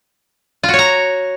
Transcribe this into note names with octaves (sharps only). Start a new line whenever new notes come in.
F4
F#4
C#5
A#5